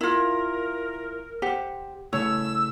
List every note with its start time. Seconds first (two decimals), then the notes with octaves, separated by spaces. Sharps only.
0.01 E4 F4 A#4
1.42 G4 C5 F#5
2.13 C#3 A3 E4 C#5 E6